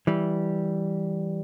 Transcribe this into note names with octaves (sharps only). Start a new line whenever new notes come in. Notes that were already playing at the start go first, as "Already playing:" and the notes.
E3 G3